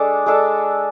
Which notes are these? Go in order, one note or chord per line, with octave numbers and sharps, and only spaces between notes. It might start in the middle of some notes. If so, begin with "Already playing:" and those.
Already playing: G#3 D4 A4
G#3 D4 A4